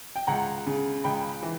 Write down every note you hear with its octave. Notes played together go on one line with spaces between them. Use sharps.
G5
C#2 F#5 A#5
C#3
C#2 G5 B5
E3